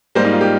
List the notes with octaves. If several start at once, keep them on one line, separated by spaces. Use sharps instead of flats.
G#2 G3 A#3 C5
D#4
F4
G4